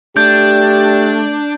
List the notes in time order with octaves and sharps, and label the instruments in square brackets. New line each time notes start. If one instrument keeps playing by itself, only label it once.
[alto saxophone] A3 [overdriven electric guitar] D4 [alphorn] G4 [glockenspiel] G6